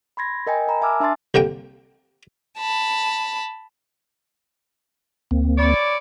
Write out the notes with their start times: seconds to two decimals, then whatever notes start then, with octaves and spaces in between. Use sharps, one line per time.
0.17 B5 C6 G#6 A#6
0.47 A#4 D#5 G5 G#5
0.68 A#4 A#5 B5
0.81 E5 G#5 A5 D6 E6 F6
1.00 D4 E5 A5 C6 A6
1.34 C2 D3 A#3 G5
2.58 A5 B5
5.31 D2 A#3 C4
5.57 E4 C#5 D5